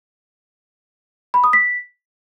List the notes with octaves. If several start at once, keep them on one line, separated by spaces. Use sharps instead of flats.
B5
D#6
B6